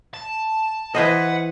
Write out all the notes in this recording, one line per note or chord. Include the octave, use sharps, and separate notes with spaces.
A5
E3 B4 C5 D#5 F#5